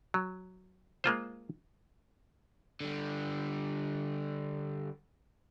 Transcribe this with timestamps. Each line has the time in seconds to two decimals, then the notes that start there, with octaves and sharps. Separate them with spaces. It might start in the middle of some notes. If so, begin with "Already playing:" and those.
0.14 F#3
1.04 G#3 A#3 F4 C5
2.80 D3 G3